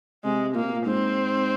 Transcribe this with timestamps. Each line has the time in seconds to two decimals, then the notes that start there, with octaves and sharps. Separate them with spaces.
0.24 C3 G#3
0.55 A#2 A#3
0.64 C3
0.72 A#2
0.86 G#2 C4